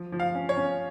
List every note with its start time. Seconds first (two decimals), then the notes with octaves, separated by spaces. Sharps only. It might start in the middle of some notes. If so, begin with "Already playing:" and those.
Already playing: F3
0.12 F3
0.20 F5
0.35 C#4
0.49 C#5
0.57 C#4